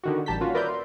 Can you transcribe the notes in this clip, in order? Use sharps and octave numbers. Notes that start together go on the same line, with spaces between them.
D3 D#3 F#4
A1 G3 A5 A#5 G6 B6
A#3 C#4 F4 F#4
A#4 B4 D5 E5 A#5 G6
C6